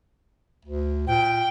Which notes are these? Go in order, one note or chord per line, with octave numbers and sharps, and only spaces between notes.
D2
A#2 G5